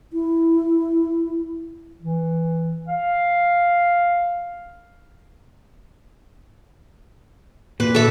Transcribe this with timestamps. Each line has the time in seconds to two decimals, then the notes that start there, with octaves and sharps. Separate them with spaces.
0.13 E4
2.02 E3
2.88 F5
7.80 A#2 B4
7.95 A4 E5